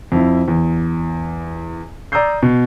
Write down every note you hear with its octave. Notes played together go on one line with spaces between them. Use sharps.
F2 E4
E2
D5 A#5 D#6 E6 G6 C7
B2